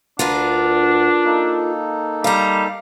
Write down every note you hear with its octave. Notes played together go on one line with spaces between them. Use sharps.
D2 D4 F4 A#4 B4 F#5
A#3 D#4 A4
G3 F5 A#5